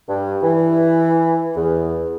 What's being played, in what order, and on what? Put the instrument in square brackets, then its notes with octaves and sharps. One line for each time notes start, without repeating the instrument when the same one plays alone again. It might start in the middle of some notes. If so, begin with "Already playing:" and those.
[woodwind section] G2
E3
E2